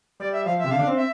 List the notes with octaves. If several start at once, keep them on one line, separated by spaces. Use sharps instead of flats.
G3 D5
E5
F3 F5
E5
C3
D3 F5
D4
C4
E5